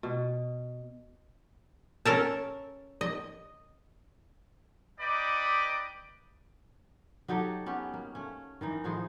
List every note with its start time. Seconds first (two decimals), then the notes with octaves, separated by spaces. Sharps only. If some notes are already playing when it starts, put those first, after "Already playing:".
0.03 B2
2.05 C#4 A4 A#4 A5
3.01 D#5
5.00 D#4 B4 D5 D#5 G5 D6
7.28 F#3 D#4 G4 A4
7.66 B3 C#4 G4 G#4
7.94 A#3
8.15 A3 C#4
8.61 D#3 E3 D#4
8.84 A2 F3 D#4 G#4